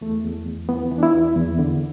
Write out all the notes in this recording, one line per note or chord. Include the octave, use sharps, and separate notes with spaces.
E2 A3
E2
E2
E3 B3
E3
D4
E4
E2
E2
D3